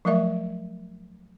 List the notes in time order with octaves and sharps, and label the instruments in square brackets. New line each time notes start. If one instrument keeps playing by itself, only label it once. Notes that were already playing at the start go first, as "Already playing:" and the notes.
[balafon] F3 F#3 A3 A#4 E5 C#6